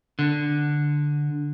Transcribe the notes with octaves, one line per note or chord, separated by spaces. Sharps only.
D3